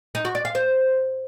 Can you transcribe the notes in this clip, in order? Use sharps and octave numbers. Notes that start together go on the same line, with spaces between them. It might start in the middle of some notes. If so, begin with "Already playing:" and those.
D#4
F#4
D5
F5
C5